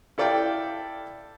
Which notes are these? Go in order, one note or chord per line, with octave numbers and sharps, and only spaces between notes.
E4 A4 D5 F5 G5